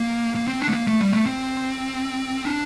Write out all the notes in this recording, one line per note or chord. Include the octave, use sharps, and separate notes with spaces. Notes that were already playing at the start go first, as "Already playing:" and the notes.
Already playing: A#3
A#3
C4
D4
A3
A#3
A3
G3
A3
C4
D4